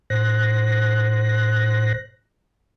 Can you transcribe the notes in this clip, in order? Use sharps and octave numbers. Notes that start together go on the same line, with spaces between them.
A2 C5 F#6 A#6